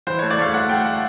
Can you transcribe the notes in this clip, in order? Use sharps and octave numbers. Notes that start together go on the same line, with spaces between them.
E3 C5
A3 C#5
D5
A3 F5
A3 F#5
A3 G5
F#5